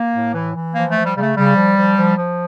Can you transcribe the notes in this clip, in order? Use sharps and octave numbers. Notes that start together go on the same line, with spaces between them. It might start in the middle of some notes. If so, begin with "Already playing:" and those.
Already playing: A#3
A2
E3
E3
F3 A#3
F3 A3
G3
C#3 G3 A3
C#3 G3
F3
F3
F3
F3